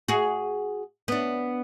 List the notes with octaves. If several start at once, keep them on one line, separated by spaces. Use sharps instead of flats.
F#4 G#4
B3 D4